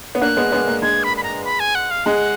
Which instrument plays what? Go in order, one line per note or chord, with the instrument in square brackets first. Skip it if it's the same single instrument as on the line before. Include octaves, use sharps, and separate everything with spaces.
[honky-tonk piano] B3
[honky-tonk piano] A#3 D4 [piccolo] F#6
[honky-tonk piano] G#3 B3
G#3 B3
A#3
[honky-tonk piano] G#3 [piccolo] G#6
[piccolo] B5
B5
A#5
B5
G#5
F#5
F5
[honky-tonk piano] G#3 [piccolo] F#5